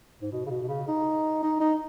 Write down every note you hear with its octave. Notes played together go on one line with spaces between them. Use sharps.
G#2
B2
C#3
B2
B2
C#3
D#4
D#4
D#4